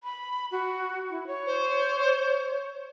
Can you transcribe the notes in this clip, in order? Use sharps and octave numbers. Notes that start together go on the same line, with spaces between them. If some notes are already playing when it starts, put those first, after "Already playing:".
B5
F#4
E4
C#5
C5